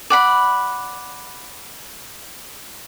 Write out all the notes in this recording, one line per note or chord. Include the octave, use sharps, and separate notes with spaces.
D5 F#5 B5